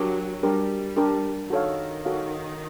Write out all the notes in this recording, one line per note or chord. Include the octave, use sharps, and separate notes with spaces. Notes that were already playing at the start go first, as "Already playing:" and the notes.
Already playing: F#3 D4 G4 A#4
G3 D4 G4 A#4
D4 G4 A#4
D#3 F#4 A4 C#5 F5
F#4 A4 C#5 F5